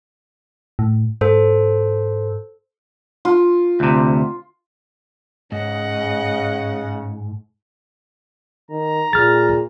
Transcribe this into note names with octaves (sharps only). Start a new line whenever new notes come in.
A2
G#2 A4 C5
F4
D2 C3
G#2 C#3 D#5 F#5
D#3 A#5
A#2 G#4 F6 A6